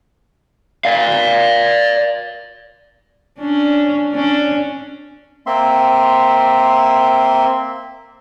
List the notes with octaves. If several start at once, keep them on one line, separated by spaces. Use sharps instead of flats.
D5 F5
C#4 D4
C#4 D4
A#3 C4 E5 C6